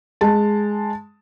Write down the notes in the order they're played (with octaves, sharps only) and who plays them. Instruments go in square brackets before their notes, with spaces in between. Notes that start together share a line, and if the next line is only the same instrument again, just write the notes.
[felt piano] G#3 A5